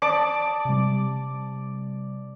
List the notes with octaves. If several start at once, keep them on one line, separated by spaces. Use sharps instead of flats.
D5 A5 D6 D#6
C3 G3